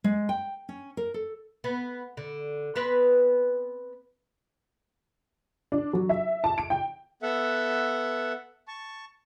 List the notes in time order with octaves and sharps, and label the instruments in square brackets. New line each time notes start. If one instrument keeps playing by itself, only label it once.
[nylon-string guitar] G#3
G5
C#4
A#4
A4
[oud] B3
D3
B3 C4 B4
[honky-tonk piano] D4
F#3
E5
A5
D7
G5
[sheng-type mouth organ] B3 A4 E5 F#5
A5 C#6